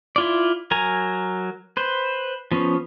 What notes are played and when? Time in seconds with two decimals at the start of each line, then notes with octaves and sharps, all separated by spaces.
0.16 E4 F4 D5
0.71 F#3 A#4 G#5 A#5
1.77 B4 C5
2.52 F3 B3 C#4